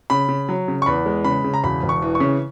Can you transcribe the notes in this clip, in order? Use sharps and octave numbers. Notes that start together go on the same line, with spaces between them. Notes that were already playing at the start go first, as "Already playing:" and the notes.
C#3 B5
C#3
F#3
C#3
C#6
E2 B5
G#3
C#3 B5
C#3
A#5
E1 B5
E1
C#6
E3
C#6
C#3